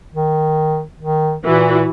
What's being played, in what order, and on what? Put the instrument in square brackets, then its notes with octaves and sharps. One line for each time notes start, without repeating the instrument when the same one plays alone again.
[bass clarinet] D#3
D#3
[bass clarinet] A#2 [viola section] E3 F#4